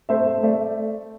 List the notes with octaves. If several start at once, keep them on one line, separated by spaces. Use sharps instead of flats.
A3 C5 E5
A3
A3 D5